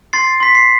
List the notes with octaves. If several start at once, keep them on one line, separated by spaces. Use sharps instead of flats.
C6 A6 C7
C6 B6
C7